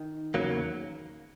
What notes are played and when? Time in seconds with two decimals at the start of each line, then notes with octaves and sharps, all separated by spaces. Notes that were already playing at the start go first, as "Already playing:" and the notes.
Already playing: D#3
0.34 E2 C#3 F#3 A#3